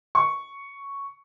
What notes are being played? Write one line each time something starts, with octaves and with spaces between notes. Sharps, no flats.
C#6